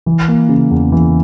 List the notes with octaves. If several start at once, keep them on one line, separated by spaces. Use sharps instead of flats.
E3
A#3
C#3
E2
E3